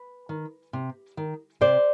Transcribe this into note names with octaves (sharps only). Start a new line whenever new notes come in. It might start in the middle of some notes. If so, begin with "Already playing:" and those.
Already playing: B4
D#3
C3
D#3
C3 C5 D5